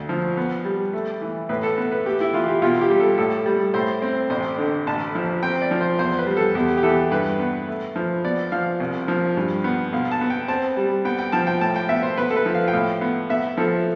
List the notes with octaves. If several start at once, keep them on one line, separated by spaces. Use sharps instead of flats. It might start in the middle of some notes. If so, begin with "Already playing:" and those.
Already playing: D2
F3
B3
G3
A3
E3
A2 B4
A4
B3
B4
A3 G4
E4
E3 F4
G4
B1 F4
G4
G3
A4
A2 A4
G3
A2 C5
C4
A1 C5
D3
A1 A5
F3
C4 G5
D5
F3
C5
E2 C5
B4
G3
A4
E2 G4
G4
E3 A4
G2 B4
B3
A3
F3
B3 D5
F3 F5
C2
F3
G2
B3
B1 F5
A5
B3
G5
C4 A5
G3
B3 G5
G5
F3 A5
G5
A2 A5
G5
B3 E5
C5
B3 B4
A4
B4
F3
F5
G5
A2 F5
B3
B3 E5
F3 A4